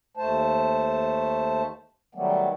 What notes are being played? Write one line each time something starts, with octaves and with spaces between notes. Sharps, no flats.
D#2 A3 C5 A5
D#3 F#3 G3 A3 B3